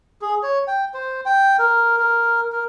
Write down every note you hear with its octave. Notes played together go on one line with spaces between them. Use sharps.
G#4
C#5
G5
C5
G5
A#4
A#4
A#4